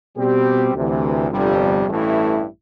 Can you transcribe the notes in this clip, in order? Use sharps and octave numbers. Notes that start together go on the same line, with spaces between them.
B2 G3 C4 G4
D2 C3 E3
G1 F2 C3 G3
A1 G2 E3 A3 E4